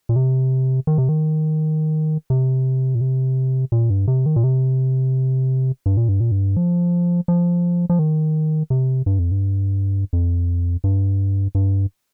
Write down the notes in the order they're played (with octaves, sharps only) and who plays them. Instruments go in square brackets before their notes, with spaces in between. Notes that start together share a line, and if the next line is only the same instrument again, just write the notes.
[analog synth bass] A#2
C3
D#3
C3
D#3
C3
A#2
C3
A#2
G2
C3
D#3
A#2
C3
G2
A#2
G2
A#2
G2
F3
F3
F3
D#3
C3
G2
F2
G2
F2
G2
G2